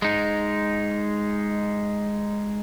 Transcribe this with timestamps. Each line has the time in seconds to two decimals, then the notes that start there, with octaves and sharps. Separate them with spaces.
0.02 G#3 D#4